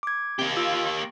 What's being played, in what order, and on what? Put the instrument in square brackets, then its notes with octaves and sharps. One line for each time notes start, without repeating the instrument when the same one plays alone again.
[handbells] D6 G#6
[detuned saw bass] C3 [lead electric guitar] A#3 G4
[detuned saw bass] F4 [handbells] E6